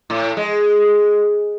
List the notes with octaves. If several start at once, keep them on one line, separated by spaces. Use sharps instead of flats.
A2
G#3